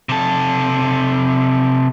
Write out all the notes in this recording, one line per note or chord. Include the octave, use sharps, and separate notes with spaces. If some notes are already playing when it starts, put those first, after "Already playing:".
C3 A4